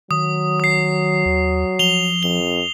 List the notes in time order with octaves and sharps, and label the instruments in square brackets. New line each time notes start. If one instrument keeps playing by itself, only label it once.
[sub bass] D#3 [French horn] F#3 [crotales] D#6
[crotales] D#6 C7
[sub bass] D#2
[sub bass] F3 [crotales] F7 G7
[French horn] F2 [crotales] G7